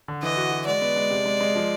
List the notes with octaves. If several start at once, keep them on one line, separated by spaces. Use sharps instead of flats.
D3
E3 D#5
F#4
F#4
G#3 D5
B3
G#3
C3
G#3
G#3
F3